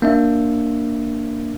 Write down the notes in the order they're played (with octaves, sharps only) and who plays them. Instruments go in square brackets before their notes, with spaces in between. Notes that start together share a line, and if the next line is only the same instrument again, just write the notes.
[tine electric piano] A#3 D4 E5